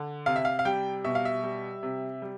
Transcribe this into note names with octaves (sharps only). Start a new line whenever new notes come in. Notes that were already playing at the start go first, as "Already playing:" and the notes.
Already playing: D3
C3 F5
E5
F5
F5
G3 G5
B2 E5
F5
E5
G3
C3
G3